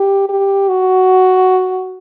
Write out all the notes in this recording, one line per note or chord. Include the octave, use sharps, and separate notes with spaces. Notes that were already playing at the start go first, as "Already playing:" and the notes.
Already playing: G4
G4
F#4